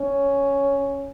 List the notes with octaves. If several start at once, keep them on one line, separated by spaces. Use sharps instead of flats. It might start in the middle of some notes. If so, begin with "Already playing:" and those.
Already playing: C#4